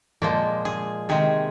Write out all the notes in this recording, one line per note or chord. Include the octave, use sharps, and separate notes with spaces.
A#2 F3 G#3 A#3
G#4
C3 D#3 G#3 G#4